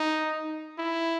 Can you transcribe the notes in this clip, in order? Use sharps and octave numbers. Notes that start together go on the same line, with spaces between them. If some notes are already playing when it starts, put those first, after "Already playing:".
Already playing: D#4
E4